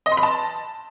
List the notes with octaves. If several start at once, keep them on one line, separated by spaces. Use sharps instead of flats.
D#5
C6
B5
A5